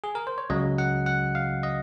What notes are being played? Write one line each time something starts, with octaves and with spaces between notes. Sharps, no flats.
G#4
A#4
C5
C#5
C#2 C#3 F#3 D#5
F#5
F#5
F5
D#5